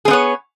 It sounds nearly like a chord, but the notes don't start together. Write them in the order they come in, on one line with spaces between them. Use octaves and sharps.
G#4 C4 B3 C#5